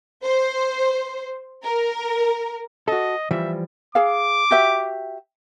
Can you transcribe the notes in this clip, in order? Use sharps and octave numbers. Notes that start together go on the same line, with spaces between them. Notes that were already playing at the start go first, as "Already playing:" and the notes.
C5
A#4
F#4 A4 D#5
E3 F3 G3 E5
G#4 F5 D6
F#4 G4 E5